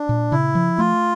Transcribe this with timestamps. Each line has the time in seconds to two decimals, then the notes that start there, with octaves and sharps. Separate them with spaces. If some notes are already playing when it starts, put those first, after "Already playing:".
Already playing: D4
0.09 A#2
0.32 C#3 E4
0.55 F3
0.78 A3 F4